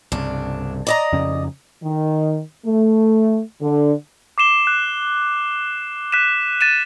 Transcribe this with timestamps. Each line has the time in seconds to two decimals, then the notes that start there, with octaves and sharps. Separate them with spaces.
0.12 C2 G2 C#3 D4
0.87 D5 D#5 A#5
1.12 F2 C#3 C#4
1.84 D#3
2.66 A3
3.62 D3
4.38 D6 C7 E7 G7
4.67 F#6
6.12 F#6 B6 D#7 E7
6.61 A6 D#7 E7